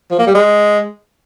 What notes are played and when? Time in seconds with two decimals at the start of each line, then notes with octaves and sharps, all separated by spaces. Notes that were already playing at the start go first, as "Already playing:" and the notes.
0.11 F3
0.19 A#3
0.27 G3
0.35 G#3